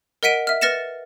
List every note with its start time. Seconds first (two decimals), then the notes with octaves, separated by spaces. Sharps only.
0.23 A#4 D#5 F#5 B6 D7 D#7
0.47 E5 F6
0.61 B4 F6 A6 A#6 C#7 E7